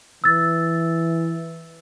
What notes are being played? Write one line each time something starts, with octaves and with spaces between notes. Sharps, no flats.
E3 E6 A6